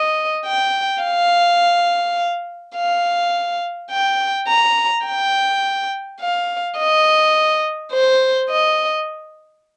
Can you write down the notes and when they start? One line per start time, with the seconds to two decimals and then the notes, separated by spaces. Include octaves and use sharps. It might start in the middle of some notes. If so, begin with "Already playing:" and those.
Already playing: D#5
0.46 G5
1.03 F5
2.76 F5
3.91 G5
4.48 A#5
5.06 G5
6.20 F5
6.78 D#5
7.92 C5
8.49 D#5